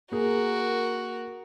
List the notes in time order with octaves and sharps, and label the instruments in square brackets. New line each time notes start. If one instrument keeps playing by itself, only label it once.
[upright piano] A#3 G#4 [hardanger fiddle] F#4 A#4